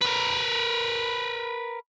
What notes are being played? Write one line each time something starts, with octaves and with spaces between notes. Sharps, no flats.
A#4 B4